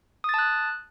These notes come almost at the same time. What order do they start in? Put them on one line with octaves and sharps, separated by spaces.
D#6 A6 A5 F#6